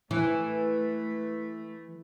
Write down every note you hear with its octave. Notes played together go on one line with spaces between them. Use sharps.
E3 A3